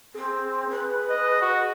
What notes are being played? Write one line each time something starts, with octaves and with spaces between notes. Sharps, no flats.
C4 G#4
B4
D#5
F#4